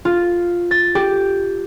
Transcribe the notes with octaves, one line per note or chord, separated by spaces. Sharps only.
F4
A6
G4